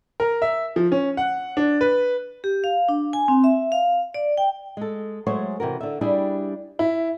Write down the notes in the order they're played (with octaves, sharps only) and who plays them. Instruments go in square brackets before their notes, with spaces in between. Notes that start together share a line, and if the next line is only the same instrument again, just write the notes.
[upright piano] A#4
E5
F3
C#4
F#5
D4
B4
[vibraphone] G4
F5
D4
G#5
C4
E5
F5
D5
G5
[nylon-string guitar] G#3 A4
F#3 G#3 A3 G#4 C5 C#5
C3 E3 F#4 A#4
D3 E5
G3 D4 E4 G4 G#4
[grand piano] E4